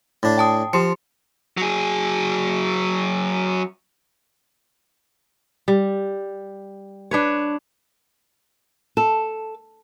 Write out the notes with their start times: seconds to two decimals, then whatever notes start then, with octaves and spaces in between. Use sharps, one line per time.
0.23 A2 D4
0.38 G5 A5 D#6
0.73 F3 G4 C6 C#7
1.57 F#3 G#4
5.68 G3
7.11 D4 B4 C#5
8.97 A4